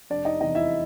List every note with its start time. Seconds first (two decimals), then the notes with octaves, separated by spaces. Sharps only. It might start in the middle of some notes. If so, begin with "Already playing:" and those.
0.10 F1 D4 D5
0.25 D#4 D#5
0.41 E2 C3 D#4 D#5
0.55 E4 E5